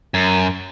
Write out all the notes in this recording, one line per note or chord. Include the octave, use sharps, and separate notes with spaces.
F#2